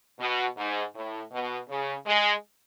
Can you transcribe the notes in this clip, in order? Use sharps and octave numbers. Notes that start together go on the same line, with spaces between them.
B2
G#2
A2
B2
C#3
G#3